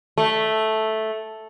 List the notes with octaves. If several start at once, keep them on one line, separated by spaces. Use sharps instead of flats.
A3